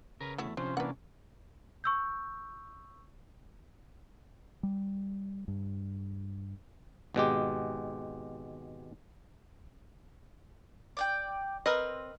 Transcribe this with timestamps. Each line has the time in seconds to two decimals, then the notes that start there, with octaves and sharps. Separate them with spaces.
0.21 C#3 A#4 B4
0.38 E2 A3 E4 F#4
0.57 C3 F3 C#4 D4 C5
0.77 E3 A#3 D4 B4 F#5
1.84 C#6 E6 G6
4.63 G3
5.48 G2
7.14 G#1 B2 G#3 G4
10.97 D5 F#5 G5
11.66 C4 A#4 B4 D#5